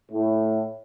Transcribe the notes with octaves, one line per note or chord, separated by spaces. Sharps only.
A2